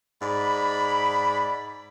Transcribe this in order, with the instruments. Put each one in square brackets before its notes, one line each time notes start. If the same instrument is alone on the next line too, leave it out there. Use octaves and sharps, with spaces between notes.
[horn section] G#2 D5 B5